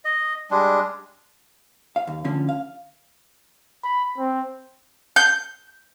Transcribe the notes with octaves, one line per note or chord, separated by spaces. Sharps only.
D#5
G3 G#3 D4
F5
D#2
D2 D3 F3 C#4
F5
B5
C4
G6